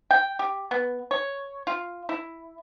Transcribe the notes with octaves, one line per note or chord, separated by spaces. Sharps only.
G5
G4
B3
C#5
F4
E4